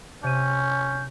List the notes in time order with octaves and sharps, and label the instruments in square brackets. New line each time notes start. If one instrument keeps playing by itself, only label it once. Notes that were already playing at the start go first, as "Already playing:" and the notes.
[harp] C3 D#7 [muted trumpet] C#4 [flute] G6